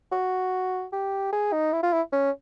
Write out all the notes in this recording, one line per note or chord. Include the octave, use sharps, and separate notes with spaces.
F#4
G4
G#4
D#4
E4
F4
E4
C#4